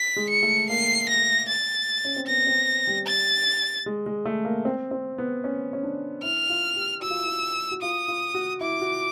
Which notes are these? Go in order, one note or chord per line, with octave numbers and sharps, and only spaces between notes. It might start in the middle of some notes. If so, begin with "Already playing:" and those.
Already playing: B6
G#3
C#7
A3
A#3 C7
A#6
A6
C#4
C4
B3 A#6
C4
G3
A6
G#3
G#3
A3
A#3
C4
C4
B3
C#4
C#4
D4
E4 F6
F4
G4
F#4 E6
F4
E4
F4
F#4
F4 D#6
F4
F#4
E4 D6
F#4